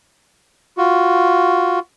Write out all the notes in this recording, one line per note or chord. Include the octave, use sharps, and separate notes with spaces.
F4 F#4